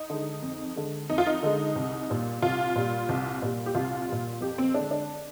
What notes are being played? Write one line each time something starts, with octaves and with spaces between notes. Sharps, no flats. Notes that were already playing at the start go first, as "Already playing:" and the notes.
Already playing: D#4
D3 G#3
F2
D3 G#3
F2 D#4
F4
D#4
D3 G#3
C2
A#2 G3
C2 F4
A#2 G3
C2
A#2 G3
G4
C2 F4
A#2 G3
F2 G4
C4
D3 G#3 D4
D4